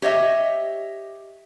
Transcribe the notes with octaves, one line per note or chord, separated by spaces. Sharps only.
G4 C#5 D#5 E5